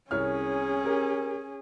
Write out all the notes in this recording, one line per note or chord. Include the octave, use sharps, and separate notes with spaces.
C2 C#4 G#4 C#5 F6
G4 A#4